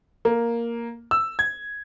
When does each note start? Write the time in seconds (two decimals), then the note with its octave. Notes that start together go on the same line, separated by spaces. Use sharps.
0.25 A#3
1.11 E6
1.39 G#6